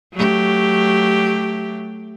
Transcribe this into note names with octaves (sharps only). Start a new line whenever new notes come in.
F#3 A3 G4